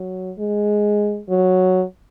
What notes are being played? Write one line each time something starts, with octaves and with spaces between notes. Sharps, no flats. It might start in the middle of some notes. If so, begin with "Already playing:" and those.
Already playing: F#3
G#3
F#3